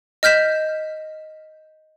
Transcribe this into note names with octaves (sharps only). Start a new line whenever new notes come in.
D#5 F6 G6 B6 E7